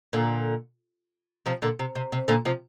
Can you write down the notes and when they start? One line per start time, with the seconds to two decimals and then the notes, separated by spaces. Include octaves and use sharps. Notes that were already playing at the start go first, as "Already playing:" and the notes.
0.13 A#2 D3
1.46 C3 F3
1.62 A#2 D3
1.79 C3
1.95 C3
2.12 C3
2.28 A#2 D3
2.45 C3 F3